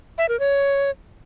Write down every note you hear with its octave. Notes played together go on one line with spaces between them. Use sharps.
E5
A#4
C#5